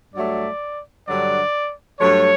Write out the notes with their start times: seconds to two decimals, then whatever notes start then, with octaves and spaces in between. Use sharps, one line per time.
0.14 G2 F#3 A3 D5
1.07 G2 D3 F#3 D5
2.00 G2 F#3 A3 C#5